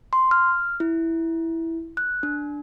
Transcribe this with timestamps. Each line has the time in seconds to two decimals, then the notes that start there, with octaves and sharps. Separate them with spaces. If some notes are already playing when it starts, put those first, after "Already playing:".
0.13 C6
0.31 F6
0.80 E4
1.97 F#6
2.23 D4